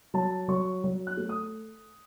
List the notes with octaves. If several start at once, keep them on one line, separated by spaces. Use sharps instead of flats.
F#3 A5
F#3 C#6
F#3
F#6
A3
D#6